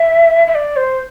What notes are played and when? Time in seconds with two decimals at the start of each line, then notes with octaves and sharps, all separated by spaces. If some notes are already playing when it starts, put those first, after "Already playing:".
Already playing: E5
0.47 E5
0.55 D5
0.76 C5